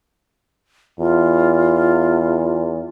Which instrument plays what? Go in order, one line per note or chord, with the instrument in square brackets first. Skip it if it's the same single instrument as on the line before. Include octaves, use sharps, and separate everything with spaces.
[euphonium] E2 [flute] F4